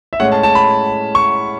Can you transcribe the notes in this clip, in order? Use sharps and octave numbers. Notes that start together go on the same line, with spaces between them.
E5
A2 G#3 C#4 F#5
A5
A5
B5
C#6